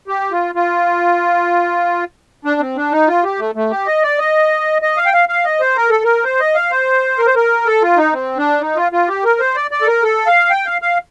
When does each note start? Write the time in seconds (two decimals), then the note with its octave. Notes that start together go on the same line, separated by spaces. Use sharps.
0.08 G4
0.31 F4
0.55 F4
2.45 D4
2.60 C4
2.77 D4
2.92 D#4
3.08 F4
3.24 G4
3.39 A3
3.55 A3
3.71 G4
3.87 D#5
4.03 D5
4.18 D#5
4.82 D#5
4.97 F5
5.06 G5
5.13 F5
5.29 F5
5.45 D#5
5.60 C5
5.76 A#4
5.90 A4
6.04 A#4
6.24 C5
6.40 D#5
6.55 F5
6.71 C5
7.18 A#4
7.27 C5
7.35 A#4
7.66 A4
7.82 F4
7.97 D#4
8.13 C4
8.37 D4
8.61 D#4
8.76 F4
8.92 F4
9.08 G4
9.24 A#4
9.40 C5
9.56 D5
9.71 D5
9.81 A4
9.87 A#4
10.03 A4
10.27 F5
10.51 G5
10.66 F5
10.82 F5